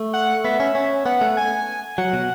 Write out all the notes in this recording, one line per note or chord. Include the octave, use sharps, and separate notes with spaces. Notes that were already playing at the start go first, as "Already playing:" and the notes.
Already playing: A3
F#5
B3 E5
C#4
C#4
B3 F#5
A3
G#5
F#3 F#5
B2